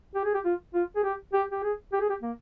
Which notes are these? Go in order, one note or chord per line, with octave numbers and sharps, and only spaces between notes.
G4
G#4
G4
F4
F4
G#4
G4
G4
G4
G#4
G4
G#4
G4
A#3